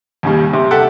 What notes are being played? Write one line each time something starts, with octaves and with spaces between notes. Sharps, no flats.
D#2 C#3 G3
C3
G4 A4 E5 F#5